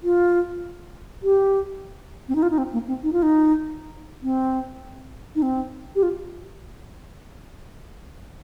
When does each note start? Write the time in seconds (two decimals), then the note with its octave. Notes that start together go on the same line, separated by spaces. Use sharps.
0.03 F4
1.23 G4
2.29 C4
2.36 D#4
2.43 F4
2.51 D#4
2.58 C4
2.73 A#3
2.88 C4
3.03 D#4
3.13 F4
3.23 D#4
4.23 C4
5.35 D#4
5.42 C4
5.96 G4
6.03 F4